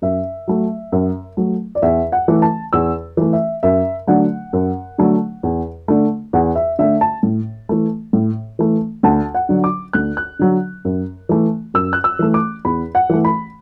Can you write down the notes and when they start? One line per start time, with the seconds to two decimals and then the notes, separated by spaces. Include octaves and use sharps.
0.02 F#2 E5
0.48 F#3 A3
0.92 F#2
1.37 F#3 A3
1.75 D5
1.82 E2 E5
2.12 F#5
2.28 E3 A3
2.42 A5
2.73 E2 E6
3.17 E3 A3
3.33 E5
3.63 F#2 E5
4.07 D3 F#3 A3 F#5
4.53 F#2
4.98 D3 F#3 A3
5.43 E2
5.88 D3 A3
6.33 E2 F#5
6.56 E5
6.79 D3 A3 E5
7.01 A5
7.23 A2
7.69 E3 A3
8.13 A2
8.59 E3 A3
9.03 D2 A5
9.35 F#5
9.49 D3 F#3
9.64 D6
9.93 D2 F#6
10.17 F#6
10.39 D3 F#3
10.85 F#2
11.29 E3 A3
11.74 F#2 E6
11.93 F#6
12.04 E6
12.19 E3 A3
12.34 D6
12.65 E2 B5
12.95 F#5
13.10 E3 A3
13.25 B5